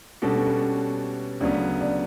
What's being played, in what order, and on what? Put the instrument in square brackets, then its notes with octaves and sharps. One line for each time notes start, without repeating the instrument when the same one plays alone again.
[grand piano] B2 G3 D4 F#4 A4 [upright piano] C#4
[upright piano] B3
C#4
[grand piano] D2 C#3 F#3 B3 [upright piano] D4
[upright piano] D4